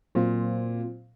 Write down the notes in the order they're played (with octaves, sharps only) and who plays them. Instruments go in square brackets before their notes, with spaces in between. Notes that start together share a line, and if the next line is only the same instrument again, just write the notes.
[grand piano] A#2 [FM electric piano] F#3 C4 F4 C5